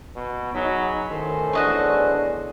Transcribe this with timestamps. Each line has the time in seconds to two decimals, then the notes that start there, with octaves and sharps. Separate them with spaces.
0.16 B2
0.54 F#3 D#4 G#4 B5
1.10 A2 D#3 C#4 A4 C5
1.53 E2 B3 D4 F#4 D#5 C#6